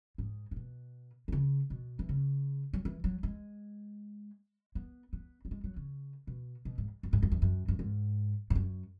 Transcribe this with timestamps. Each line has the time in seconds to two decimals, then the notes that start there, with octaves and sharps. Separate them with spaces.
0.18 G#2
0.51 G#2
0.56 B2
1.28 E3
1.32 C#3
1.70 B2
1.99 E3
2.09 C#3
2.73 F#3
2.85 E3
3.04 F#3
3.23 G#3
4.75 B3
5.13 B3
5.45 F#3
5.51 G#3
5.64 F#3
5.76 C#3
6.27 B2
6.65 B2
6.78 G#2
7.03 F#2
7.13 G#2
7.22 F#2
7.32 E2
7.42 F#2
7.68 F#2
7.79 G#2
8.50 G#2
8.55 F#2